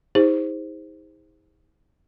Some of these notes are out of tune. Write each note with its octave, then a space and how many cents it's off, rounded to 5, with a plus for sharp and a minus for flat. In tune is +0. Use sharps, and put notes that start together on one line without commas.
D#4 +45 G#4 -40 C5 +0